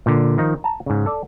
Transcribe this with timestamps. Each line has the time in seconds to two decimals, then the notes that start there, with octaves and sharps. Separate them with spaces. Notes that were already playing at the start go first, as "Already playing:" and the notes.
0.06 A#2 D3
0.38 D#3 F3 D#4
0.64 A5 A#5
0.86 G#2 C#3
1.06 A4 D5